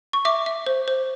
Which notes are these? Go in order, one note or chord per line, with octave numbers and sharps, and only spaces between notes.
C#6
E5 D6
E5
C5
C5